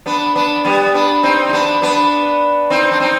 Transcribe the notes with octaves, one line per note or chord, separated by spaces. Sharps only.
B3 D4
B3 D4
G3 B3
B3 D4
C4 D#4
D#4
B3 D4
B3 D4
C4 D#4
D4
C4 D#4